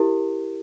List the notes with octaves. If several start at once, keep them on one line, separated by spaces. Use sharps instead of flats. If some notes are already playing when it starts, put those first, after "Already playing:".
Already playing: E4 G4 A#4